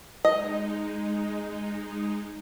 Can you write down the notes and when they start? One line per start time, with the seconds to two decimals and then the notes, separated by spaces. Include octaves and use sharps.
0.25 G#3 D#4 D#5